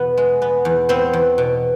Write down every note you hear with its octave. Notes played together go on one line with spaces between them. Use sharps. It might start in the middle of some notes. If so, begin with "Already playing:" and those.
Already playing: E2 B2 B3
G#3
B3
E2
B3 C4 C5
E2
B2